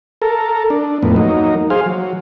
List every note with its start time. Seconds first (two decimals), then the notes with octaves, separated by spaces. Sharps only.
0.22 A4 A#4
0.70 D4
1.03 F2 A2 A#3 B3
1.16 F#3 A#3 D#4
1.70 G#4 C5 F5
1.86 F#3